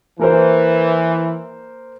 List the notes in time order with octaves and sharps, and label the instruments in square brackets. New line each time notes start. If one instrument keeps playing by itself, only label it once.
[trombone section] E3 [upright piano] A#3 A#4 C5